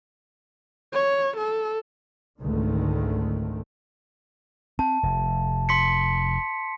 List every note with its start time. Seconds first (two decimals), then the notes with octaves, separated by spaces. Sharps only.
0.93 C#5
1.37 A4
2.39 G#1 C#2 G#2 D3 D#3 A3
4.79 C4 A5
5.03 F1
5.69 C6 B6 C#7